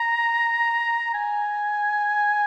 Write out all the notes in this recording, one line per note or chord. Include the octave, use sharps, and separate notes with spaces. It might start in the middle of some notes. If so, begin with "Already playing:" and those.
Already playing: A#5
G#5